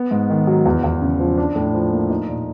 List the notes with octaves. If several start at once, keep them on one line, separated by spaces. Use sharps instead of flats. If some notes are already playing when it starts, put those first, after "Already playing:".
Already playing: B3
G#2
D#3
F#3
E2
E2
C#3
F3
D4
A2
F3
A#3
D#4
A#2